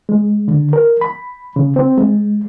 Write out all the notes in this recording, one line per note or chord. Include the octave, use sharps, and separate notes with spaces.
G#3
D3
A#4
B5
C#3
C4
G#3